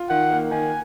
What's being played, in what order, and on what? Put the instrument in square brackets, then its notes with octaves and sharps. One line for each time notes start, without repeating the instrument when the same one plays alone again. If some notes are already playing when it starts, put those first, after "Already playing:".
Already playing: [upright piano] F4
[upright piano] D#3 [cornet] F#5
[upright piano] A#3
[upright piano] D#3 [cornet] G#5